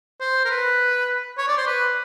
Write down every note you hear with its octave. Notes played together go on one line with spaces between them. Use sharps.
C5
A#4
B4
C#5
D5
C5
B4